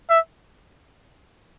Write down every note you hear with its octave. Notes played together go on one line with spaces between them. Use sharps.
E5